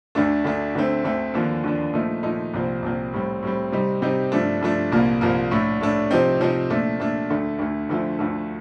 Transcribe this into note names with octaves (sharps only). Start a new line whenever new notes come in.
D2 D3 A3 D4
D2 D3 A3 D4
D2 D3 A3 C4
D2 D3 A3 C4
D#2 D3 F3 A#3 D4
D#2 D3 F3 A#3 D4
A#2 F3 A3 D#4
A#2 F3 A3 D#4
C2 A#2 F3 C4
C2 A#2 F3 C4
A2 G3 C4
A2 G3 C4
C3 G3 C4 D#4
C3 G3 C4 D#4
G2 F3 A3 D4
G2 F3 A3 D4
C2 A#2 F3 A#3
C2 A#2 F3 A#3
A2 A3 D4
A2 A3 D4
C3 F3 C4 D#4
C3 F3 C4 D#4
A#2 A3 D4
A#2 A3 D4
D2 D3 A3
D2 D3 A3
D2 D3 F3 A3
D2 D3 F3 A3